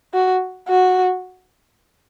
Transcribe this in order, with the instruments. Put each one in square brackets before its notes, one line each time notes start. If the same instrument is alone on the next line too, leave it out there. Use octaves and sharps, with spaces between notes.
[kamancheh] F#4
F#4